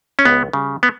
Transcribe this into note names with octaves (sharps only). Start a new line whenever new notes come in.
C#4
C#2 B3
C#3 G3
B3